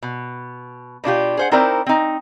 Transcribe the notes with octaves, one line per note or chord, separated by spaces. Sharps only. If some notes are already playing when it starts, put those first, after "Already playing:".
B2
B2 D4 F4 G4
G#4 C5 F#5
C4 D#4 E4 A#4 C5 D5
C4 D#4